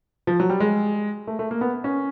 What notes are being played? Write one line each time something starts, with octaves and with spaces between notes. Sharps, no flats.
F3
F#3
G3
G#3
A3
A3
A#3
B3
C#4